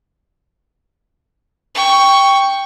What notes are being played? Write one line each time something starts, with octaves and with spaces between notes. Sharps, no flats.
G5 C#6